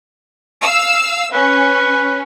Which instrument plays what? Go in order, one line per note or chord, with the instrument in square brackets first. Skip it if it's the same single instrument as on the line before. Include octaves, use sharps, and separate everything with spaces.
[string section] F5 E6
[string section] C#4 [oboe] B4